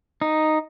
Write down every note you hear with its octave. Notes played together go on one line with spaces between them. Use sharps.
D#4